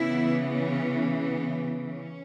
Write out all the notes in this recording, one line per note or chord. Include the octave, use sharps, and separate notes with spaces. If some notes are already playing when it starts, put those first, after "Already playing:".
Already playing: C#3 E3 B3 E4
C#4
B3
C#4